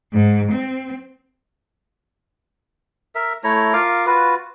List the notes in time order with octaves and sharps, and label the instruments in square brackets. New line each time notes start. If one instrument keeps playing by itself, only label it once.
[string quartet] G#2
C4
[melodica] A#4 E5
A3 E4 C#5 A#5
F4 A#4 F5 D6
F4 F#4 B4